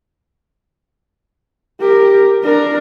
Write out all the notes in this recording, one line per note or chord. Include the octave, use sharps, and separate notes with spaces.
G4 A#4
D4 A#4